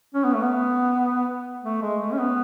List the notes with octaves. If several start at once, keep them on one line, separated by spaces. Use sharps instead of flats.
C#4
B3
A3
B3
A3
G#3
A3
C#4
B3